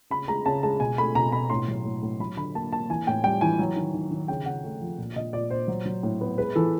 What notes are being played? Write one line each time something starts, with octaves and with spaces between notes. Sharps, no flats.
C#3 B5
G#3 A#5
C#3 A5
G#3 A5
B2 G#5
A3 B5
B2 A#5
B2 B5
A2 C6
F#3
A2
A2
F#3 B5
D3 B5
A#3 A5
A#3 A5
E3 G#5
A2 G5
G3 G5
E3 G#5
F#3
D#3
D#3
D#3
C#3 G5
C#3 F#5
A3
F3
A#2
A#2 D#5
A#2 D5
A#2 C5
F#3
F#3
A2
B3
G#3 B4
E3 A4